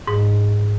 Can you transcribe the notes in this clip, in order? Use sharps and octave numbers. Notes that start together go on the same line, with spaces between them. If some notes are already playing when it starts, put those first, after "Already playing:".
G#2